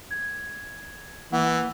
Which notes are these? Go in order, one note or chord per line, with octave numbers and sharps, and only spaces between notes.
G#6
E3 A#3 F#5